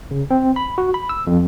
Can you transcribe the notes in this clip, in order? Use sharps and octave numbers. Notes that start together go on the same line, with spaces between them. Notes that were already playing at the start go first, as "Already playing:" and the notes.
C#3
C4
B5
F#4
B5
E6
F2